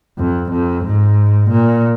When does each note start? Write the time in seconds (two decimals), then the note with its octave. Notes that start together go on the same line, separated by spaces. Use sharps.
0.18 F2
0.51 F2
0.84 G#2
1.50 A#2